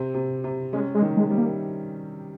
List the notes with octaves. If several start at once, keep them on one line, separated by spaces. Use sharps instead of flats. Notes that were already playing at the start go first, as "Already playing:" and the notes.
Already playing: C3 C4
C3
C3
G#3 C#4
G#3
D#3
G#3
G3
A#3